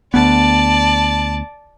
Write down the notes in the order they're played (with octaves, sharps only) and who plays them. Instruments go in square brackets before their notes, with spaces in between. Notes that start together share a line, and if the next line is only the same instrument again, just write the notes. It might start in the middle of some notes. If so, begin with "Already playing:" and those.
[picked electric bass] D2 B3 [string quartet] D5 A5